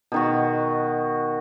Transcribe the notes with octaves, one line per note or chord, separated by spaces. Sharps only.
B2 D#3 F#4